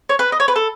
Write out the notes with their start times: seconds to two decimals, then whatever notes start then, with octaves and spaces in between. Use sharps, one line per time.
0.09 C#5
0.19 B4
0.32 D#5
0.40 C#5
0.48 B4
0.56 A4